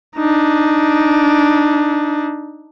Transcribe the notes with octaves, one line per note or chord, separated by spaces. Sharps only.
D4 D#4